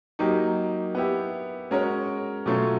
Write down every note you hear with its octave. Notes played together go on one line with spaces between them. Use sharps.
F#3 A#3 D#4 G4
B3 E4 G4
G#3 C#4 F#4 A#4 C#5
B2 F#3 A3 C#4 F4